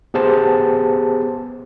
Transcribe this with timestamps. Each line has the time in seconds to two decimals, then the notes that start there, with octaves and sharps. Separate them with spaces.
0.14 B3 G4 G#4 C5 A5